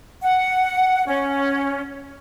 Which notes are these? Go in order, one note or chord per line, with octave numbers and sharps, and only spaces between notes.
F#5
C#4